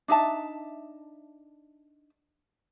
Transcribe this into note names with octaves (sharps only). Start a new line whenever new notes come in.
D4 D#4 E5 A5